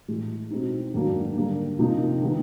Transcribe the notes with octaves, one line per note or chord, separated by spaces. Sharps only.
A2 E3 G#3
B2 G#3 C4 D#4
G#2 D#3 F#3 A#3 D4
D3 G3 A#3
C3 F3 A#3 D#4
D#3 G#3 B3